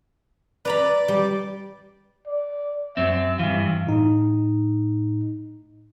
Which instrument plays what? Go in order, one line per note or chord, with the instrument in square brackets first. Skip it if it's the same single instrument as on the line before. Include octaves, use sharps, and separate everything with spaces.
[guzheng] B4 A#5 B5 [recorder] D5
[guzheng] G3
[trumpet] D5
[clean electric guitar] F#2 C4 [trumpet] E5
[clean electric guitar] G2 E3 [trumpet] F5
[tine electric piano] A2 D#4